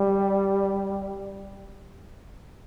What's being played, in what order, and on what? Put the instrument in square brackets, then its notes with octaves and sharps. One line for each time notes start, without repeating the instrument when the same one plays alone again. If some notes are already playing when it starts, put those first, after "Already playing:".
Already playing: [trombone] G3